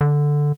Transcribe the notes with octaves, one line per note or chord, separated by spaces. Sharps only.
D3